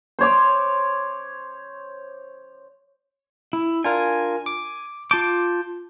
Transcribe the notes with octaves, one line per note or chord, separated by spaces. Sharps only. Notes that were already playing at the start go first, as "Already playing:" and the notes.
C5 C#5 D6
E4
D4 F4 A#4 G#5
D6
F4 A5 D6 G6